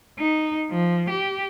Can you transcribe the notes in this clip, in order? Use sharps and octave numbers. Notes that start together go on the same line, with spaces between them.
D#4
F3
G4